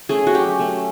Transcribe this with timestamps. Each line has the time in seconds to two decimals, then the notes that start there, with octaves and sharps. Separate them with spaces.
0.09 A3 C#4 G#4
0.27 F#4
0.34 F#3 G4
0.59 A3 C#4